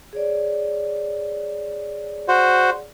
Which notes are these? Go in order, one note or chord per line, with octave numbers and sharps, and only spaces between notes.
G#4 C#5 D5
F#4 C5